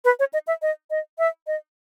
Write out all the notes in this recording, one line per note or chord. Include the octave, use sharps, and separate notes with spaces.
B4
C#5
D#5
E5
D#5
D#5
E5
D#5